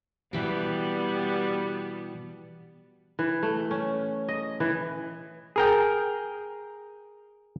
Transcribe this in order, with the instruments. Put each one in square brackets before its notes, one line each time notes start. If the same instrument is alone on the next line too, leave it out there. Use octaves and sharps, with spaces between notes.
[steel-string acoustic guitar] B2 E3 G4 [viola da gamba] G3 B3
[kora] E3
A3
C#4
D#5
E3
[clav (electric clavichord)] G#4 A#4 G5